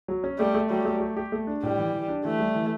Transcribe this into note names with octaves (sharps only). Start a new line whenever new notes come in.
F#3
C#4
G3 A3
A3
F#3 G3
A3
G4
G4
A3
D4
A2 G3
E3
E3
D4
E3 A3
G3
E3